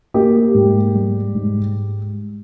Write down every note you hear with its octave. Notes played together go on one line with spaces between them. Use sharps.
A#3 G4
G#2
G3
G#2